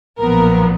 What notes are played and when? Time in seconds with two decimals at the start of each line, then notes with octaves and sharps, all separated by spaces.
0.20 B1 A#2 F3 B3 A#4